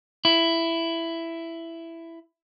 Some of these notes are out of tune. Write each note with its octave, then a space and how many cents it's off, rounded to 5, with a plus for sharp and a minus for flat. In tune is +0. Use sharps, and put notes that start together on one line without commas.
E4 +10